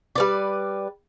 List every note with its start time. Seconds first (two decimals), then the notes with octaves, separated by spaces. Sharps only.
0.16 G3 B4 D5